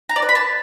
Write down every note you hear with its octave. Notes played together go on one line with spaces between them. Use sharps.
A#5
D5
B4
B5
A5